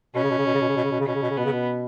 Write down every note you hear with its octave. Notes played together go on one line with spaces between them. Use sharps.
B2 C#4
C#3
B2
C#3
B2
C#3
B2
C#3
B2
C#3
B2
C#3
B2 C#4
C#3
B2
C#3
B2 B3
C#3
B2